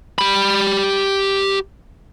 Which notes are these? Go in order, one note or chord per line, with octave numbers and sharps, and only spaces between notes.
G4 B5